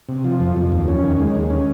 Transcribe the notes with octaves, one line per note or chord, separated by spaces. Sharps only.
C3
F3
F2
F2
D#2
C#4
D#3
G#3
D#2
C#4